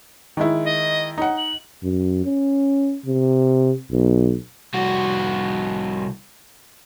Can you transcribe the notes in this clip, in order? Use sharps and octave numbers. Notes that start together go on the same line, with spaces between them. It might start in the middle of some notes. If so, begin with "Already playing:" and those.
D#3 G#3 E4
D#5
D#4 F#5
F#7
F#2
C#4
C3
B1
C2 F#4